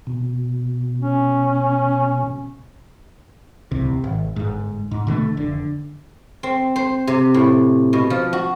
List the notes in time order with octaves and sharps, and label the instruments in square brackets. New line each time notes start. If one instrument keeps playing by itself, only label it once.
[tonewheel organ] B2
[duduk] C#4
[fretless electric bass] D1 C2 C3
G#1
G1 G#2
G#2
B2 D3 E3 A3
F1 D3
[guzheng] C4
C5
C3
A2
B2
F3
F#4